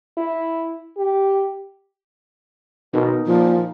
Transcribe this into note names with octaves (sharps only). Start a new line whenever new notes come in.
E4
G4
B2 D#4 A#4
A#2 F3